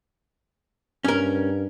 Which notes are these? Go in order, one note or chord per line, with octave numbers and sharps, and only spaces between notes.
G2 C#4 A#4